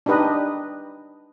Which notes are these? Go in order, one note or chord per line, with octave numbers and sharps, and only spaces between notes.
D4 D#4 G4 B4 D#5